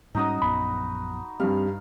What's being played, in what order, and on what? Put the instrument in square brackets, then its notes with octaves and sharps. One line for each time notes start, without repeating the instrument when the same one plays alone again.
[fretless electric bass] G#2 G3 C#4 [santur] D#4 F#4 D#6
[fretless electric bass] A#1 F#2 B3 [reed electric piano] B5
[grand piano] G2 G3 [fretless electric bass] C4 [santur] F5